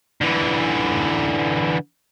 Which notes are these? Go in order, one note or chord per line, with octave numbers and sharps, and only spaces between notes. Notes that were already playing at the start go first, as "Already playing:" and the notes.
D3 E3